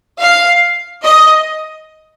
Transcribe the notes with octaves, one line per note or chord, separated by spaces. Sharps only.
F5
D#5